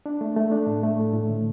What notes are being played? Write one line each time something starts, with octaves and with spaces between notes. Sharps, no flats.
D4
A3
A3
D4
A2
A3
A2
A2
D3